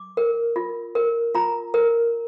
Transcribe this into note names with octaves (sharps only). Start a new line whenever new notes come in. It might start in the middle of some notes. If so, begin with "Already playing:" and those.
Already playing: D6
A#4
F4
A#4
F4 A#5
A#4